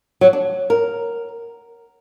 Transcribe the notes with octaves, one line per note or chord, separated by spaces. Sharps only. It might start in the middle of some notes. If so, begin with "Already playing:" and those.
F#3
D4
A#4